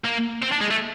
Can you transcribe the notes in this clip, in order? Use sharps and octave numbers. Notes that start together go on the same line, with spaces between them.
A#3
C4
D4
G#3
A3